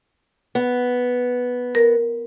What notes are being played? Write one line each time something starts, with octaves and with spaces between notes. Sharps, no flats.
B3
A#4